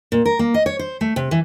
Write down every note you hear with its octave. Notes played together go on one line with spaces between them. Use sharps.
A#2
A#4
A#3
D#5
C#5
C5
A3
C3
E3